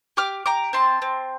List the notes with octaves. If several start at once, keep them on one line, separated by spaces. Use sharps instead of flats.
G4 D6 F6
G4 A#5 D6
C4 A5 C6
C4